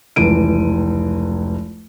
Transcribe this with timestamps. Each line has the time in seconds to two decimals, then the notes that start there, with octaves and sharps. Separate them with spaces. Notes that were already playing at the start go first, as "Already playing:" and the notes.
0.16 F1 C#2 E3 D7 D#7